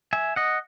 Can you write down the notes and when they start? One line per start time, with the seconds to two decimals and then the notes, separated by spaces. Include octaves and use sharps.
0.13 E5 G#5
0.36 D#5 F#5